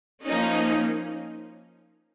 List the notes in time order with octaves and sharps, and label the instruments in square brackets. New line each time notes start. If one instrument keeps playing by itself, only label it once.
[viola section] F3 A#3 C#4 D#4